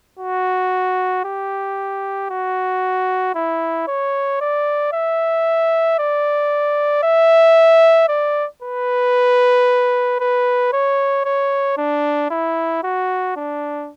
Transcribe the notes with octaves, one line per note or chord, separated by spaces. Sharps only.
F#4
G4
F#4
E4
C#5
D5
E5
D5
E5
D5
B4
B4
C#5
C#5
D4
E4
F#4
D4